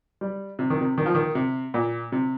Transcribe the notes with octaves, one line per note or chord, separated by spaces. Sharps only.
G3
C3
D#3
C3
D#3
F3
D#3
C3
A#2
C3